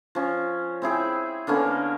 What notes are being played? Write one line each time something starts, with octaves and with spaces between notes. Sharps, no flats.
F3 C#4
C4 E4 G#4 G5
D3 A#3 B3 C#4